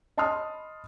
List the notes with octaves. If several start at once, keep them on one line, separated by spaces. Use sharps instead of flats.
D#5 A5 B5 C6 D#6 F6